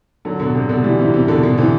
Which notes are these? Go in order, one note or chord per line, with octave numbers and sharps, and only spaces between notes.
D3 F#3
B2 D3
C3
B2 D3
E3 G3
C3 E3
C3
B2 D3
B2 D3
C3 E3